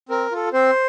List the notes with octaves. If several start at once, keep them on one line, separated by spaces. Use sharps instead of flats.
C4 A#4
F4 A4
C4 C5